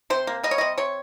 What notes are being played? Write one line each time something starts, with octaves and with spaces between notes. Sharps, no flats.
C3 C5
A#3
G3 D#5
C#5
C3 D#5
C3 C#5